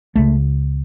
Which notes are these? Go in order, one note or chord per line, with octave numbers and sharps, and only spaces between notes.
C#2 C#3 A3